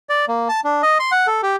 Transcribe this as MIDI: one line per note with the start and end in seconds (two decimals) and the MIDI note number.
0.09 0.25 74
0.28 0.48 58
0.49 0.60 81
0.64 0.82 62
0.83 0.98 75
1.00 1.11 84
1.12 1.27 78
1.27 1.41 69
1.43 1.56 67